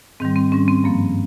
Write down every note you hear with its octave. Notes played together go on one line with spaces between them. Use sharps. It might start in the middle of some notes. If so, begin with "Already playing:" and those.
G#2 D#3 G3 C4
C4
G#2 G3 C#4
C4
G2 F3 A#3